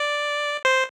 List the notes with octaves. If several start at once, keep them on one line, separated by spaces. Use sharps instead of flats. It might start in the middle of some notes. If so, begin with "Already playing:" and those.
Already playing: D5
C5